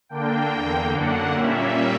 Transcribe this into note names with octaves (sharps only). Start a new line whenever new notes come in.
D3 A#3 D4 G5
E2 D3 A#3
F#2 D3 A#3 D4 F#5
A#2 G3 A#3 C#4 E5